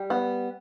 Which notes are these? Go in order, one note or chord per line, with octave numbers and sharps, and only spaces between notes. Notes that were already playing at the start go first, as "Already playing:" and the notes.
Already playing: G3
B3